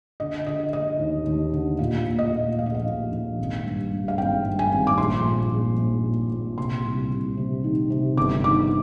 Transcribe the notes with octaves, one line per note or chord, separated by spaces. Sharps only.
D3 D#5
D3 D#5
D3 D#5
D#2
D#2
D3
A#2 F5
A#2
D#5
A#2
A#1 F5
D#5
F5
A#1
A#1
G#1
G2
G2
F5
G#1 G5
G2
G#5
G#1
D6
A#1 C6
A#2
A#1
A#1
A#2
A#2
C3 C6
C2
C2
C3
D#3
C3
G1 D6
D#3 D6